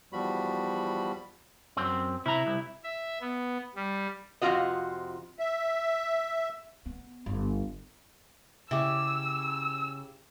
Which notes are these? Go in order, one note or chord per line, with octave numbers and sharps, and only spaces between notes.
E2 F3 G3 F#4 B5
F#2 C4
C3 E4 A#5
C2
E5
B3
G3
F2 C3 E3 F4 F#4 D#5
E5
B3
G1
C#3 E4 G4 D6 E6